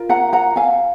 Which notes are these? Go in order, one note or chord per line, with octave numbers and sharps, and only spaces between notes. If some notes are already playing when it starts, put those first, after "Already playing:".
Already playing: F4 A#4
F#5 A#5
F#5 A#5
F5 G#5